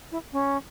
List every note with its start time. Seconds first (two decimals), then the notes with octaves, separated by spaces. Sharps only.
0.12 E4
0.32 C#4